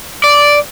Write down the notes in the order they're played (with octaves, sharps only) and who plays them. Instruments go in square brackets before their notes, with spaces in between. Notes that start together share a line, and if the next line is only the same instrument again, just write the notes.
[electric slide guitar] D5